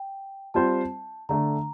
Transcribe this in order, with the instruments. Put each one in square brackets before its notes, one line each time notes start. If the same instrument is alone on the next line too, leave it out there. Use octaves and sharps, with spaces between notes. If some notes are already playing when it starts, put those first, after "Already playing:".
Already playing: [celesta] G5
[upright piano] G3 C4 F4 C5 [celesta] A5
[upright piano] D3 A3 D4 [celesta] A#5